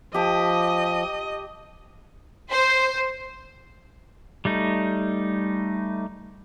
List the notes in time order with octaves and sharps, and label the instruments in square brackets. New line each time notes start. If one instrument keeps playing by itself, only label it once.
[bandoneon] F3 [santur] G4 A5 [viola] D#5
[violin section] C5
[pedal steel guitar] G3 A3 D#4